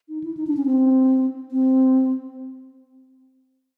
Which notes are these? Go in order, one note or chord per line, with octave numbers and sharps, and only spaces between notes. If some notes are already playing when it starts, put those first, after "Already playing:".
D#4
E4
D#4
D4
C#4
C4
C4